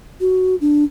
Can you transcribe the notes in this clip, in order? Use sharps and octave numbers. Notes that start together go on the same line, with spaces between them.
F#4
D4